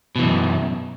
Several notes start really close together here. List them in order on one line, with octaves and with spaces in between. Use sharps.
B2 E3 F#2